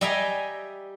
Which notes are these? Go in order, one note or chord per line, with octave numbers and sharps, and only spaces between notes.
G3 D#5 E5 G5 G#5 A#5